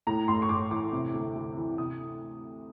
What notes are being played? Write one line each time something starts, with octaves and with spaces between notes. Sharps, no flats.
A2 A#5
A1 C6
C#6
A1 D6
E3 D6
C3
D2
D2
E3
C3 D#6